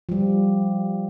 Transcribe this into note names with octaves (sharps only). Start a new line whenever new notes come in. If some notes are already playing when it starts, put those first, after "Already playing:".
F3 G3